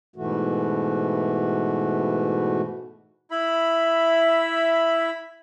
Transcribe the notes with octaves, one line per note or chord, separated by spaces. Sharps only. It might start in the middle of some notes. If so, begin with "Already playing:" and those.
G#2 B2 E3 A3 F#4
E4 E5 B5